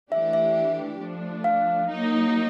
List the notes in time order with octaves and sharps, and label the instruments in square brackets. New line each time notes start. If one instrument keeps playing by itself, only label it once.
[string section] E3 A3 D4 G4 [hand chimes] E5
[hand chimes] E5
[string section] F3 A3 D4
[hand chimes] F5
[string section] F#3 A#3 D#4